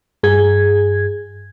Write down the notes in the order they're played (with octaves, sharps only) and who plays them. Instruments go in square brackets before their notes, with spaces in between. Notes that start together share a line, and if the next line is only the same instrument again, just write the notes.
[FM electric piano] G2 G#4 G#6